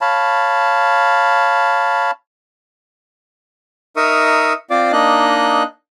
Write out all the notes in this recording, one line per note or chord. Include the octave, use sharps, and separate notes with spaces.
C#5 F5 A5 B5
D#4 A#4 E5 C#6 D#6
C4 F4 C5 D5 D6
A#3 D4 D#4 D#5 F#6